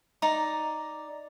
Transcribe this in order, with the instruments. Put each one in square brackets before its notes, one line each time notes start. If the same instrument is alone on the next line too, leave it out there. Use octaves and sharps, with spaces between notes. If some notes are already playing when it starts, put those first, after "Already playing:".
[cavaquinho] D#4 D5 A#5